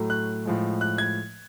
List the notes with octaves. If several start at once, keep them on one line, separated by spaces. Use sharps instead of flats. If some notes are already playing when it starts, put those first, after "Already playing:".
Already playing: A2 F#3 A3
F#6
A2 F3 G#3
F#6
G#6